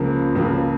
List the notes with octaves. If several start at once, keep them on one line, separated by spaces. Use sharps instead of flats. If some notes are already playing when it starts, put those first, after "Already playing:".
Already playing: C#2 C#3 F3 A#3
C#2 C#3 F3 A#3